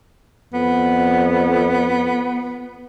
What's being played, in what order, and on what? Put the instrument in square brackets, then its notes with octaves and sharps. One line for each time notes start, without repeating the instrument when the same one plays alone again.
[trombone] F2 [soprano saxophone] B3